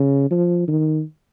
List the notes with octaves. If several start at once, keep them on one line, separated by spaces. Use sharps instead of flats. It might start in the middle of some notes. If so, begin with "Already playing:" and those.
Already playing: C#3
F3
D#3